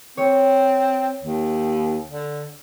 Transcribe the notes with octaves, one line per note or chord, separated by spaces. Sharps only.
C4 C#5
D#2
D3